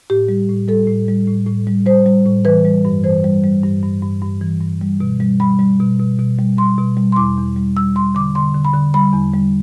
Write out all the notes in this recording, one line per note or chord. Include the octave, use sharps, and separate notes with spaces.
A2 G4
G3
A2
G3 A4
A2
G3
A2
A2
G3
G3 C5
G3
A2
E3 B4
G3
G2
E3 C5
G3
G3
G2
G2
G2
G2
E3
G2
G3
B2
G3
G3 B5
G3
B2
B2
B2
G3
G3 C6
B2
G3
C6
E2 D6
E2
G3
G3 E6
G3 C6
D3 D6
D3 C6
D3
B5
D3
G3 B5
E2
G3